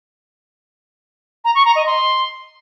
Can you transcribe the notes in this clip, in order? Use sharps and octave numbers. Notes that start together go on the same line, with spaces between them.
A#5
C#6
A#5
D#5
C6